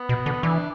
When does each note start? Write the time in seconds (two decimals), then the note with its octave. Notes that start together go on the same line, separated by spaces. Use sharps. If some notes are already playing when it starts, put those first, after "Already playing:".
Already playing: B3
0.09 B2
0.26 D3
0.43 E3 D4